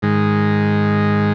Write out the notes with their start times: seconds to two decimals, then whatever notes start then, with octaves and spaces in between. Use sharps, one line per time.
0.02 G#2 D#3 G#3